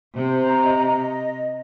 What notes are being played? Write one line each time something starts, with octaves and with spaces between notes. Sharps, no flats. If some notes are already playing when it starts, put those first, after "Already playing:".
C3 C5
A#5
D#5
D#5